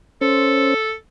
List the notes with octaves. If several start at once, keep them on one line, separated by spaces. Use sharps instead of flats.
C#4 A4 C5